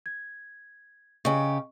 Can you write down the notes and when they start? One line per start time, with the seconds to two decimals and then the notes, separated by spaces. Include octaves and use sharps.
0.06 G#6
1.25 C#3 G4 D#5 C#6